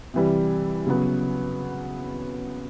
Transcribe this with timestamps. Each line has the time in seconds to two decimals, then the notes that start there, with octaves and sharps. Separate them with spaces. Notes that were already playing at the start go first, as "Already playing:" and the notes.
0.14 C3 E3 G3
0.87 C#3 F#3 B3